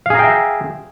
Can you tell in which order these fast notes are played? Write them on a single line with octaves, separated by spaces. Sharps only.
F5 G#4 A#5 G5 E5